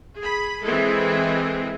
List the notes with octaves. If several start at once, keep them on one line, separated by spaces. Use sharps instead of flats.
G#4 B5
E3 G#3 C4 E4 G#4 A4